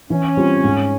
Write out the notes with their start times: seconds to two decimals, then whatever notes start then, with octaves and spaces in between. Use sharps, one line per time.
0.10 E3 C#4
0.37 G3 C4 F4
0.64 G#2